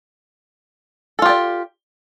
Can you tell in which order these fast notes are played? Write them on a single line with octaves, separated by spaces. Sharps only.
A4 F4 G4 D5